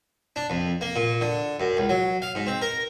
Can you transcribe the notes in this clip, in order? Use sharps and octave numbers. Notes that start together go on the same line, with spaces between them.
D4
F2
A#3
A#2
D3
F#2
C#2
F#3
F5
G#2
C4
A#4